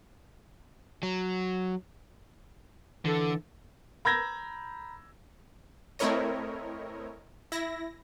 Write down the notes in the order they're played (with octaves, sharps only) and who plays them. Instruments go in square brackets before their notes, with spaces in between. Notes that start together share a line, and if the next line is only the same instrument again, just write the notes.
[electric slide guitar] F#3
[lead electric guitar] D3 [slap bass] E3 [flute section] A4
[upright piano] A#5 B5 E6 G6 G#6 A#6
[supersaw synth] A3 C4 E4 A#4 C#5 D#5
E4 A#6